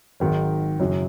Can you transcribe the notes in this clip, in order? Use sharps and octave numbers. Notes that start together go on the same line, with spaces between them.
G#1 G#2 D#3 F#3
F#1 F#2 F#3